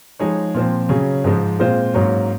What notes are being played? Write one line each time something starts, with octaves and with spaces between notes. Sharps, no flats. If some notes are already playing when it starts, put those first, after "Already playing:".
F3 G#3 D#4 G#4 C#5
A#2 F3 C4
C#3 F#3 C#4 G#4
G#2 F3 G#3
A#2 G#3 C4 F4 C5
G#2 F#3 A#3 C#4